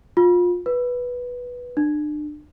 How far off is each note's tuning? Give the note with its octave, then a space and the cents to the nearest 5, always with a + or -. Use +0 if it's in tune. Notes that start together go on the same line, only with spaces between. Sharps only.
F4 +25
B4 -10
D4 +35